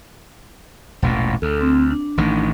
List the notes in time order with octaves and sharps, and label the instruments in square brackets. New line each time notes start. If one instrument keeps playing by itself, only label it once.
[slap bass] E1 A1 A#2
[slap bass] D2 [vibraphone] A4
[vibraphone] C4
D4
[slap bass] A1 A2 D#3